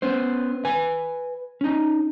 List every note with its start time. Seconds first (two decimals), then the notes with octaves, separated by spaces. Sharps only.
0.02 B3 C#4 C5
0.65 B4 G#5
1.61 C#4 D#4